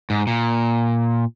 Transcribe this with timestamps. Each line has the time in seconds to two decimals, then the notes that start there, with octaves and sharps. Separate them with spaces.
0.10 G#2
0.27 A#2